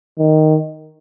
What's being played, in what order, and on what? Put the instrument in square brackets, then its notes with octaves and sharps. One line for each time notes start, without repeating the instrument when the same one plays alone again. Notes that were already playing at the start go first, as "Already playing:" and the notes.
[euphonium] D#3